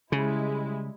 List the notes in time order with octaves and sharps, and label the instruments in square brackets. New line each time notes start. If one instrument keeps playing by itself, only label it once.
[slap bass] C#3 [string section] G3 G#3 E4